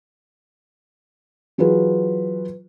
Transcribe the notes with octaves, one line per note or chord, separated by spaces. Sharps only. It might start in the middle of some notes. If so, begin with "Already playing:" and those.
E3 F#3 F4 G#4 B4